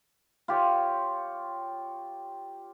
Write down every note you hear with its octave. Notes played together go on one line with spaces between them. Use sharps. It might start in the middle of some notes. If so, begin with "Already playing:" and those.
F4 G4 C#5